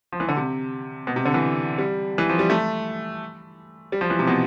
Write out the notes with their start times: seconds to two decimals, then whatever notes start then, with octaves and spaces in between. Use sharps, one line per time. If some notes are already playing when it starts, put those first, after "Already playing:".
0.12 F3
0.20 E3
0.29 D3
0.37 C3
1.07 B2
1.16 C3
1.25 D3
1.34 E3
1.78 G3
2.18 E3
2.29 F3
2.39 G3
2.50 A3
3.92 G3
4.01 F3
4.10 E3
4.19 C3
4.27 B2